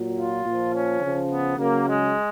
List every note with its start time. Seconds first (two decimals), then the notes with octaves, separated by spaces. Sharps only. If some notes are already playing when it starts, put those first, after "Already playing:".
Already playing: A#2 F#3
0.18 F4
0.46 A#2
0.51 F3
0.74 C#4
1.02 C#3 F3
1.30 B3
1.58 C#3 F#3 A#3
1.86 G#3